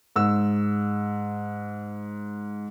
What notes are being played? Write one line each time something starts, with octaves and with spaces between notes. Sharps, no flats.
G#2 E6